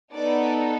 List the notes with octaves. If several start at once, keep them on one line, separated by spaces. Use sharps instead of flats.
B3 D#4 F#4 A4 D5